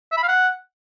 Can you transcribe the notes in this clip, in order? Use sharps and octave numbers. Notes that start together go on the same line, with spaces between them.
E5
B5
F5
F#5